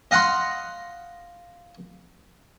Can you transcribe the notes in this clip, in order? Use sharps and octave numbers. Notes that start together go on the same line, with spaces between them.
D#5 F5 F#5 B5 C6